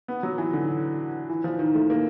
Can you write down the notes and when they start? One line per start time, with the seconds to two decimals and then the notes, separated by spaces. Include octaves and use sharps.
0.08 B3
0.23 F#3
0.38 E3
0.53 D3
1.30 E3
1.44 F3
1.59 D#3
1.74 A3
1.90 A#3